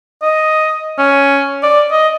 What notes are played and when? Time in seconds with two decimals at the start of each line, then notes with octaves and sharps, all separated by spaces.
0.22 D#5
0.99 C#4
1.63 D5
1.92 D#5